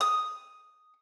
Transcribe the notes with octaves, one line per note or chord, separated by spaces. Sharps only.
D#6